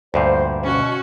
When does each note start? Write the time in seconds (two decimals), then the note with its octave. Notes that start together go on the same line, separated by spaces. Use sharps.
0.14 D2 G2 A#2 C5
0.64 B2 C#4 F#4